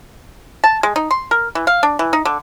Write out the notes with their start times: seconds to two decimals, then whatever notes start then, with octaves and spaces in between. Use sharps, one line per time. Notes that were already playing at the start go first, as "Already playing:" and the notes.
0.64 A5
0.83 G#3
0.96 D#4
1.11 C6
1.31 A#4
1.55 E3
1.67 F5
1.83 D4
1.99 E3
2.13 D#4
2.25 D3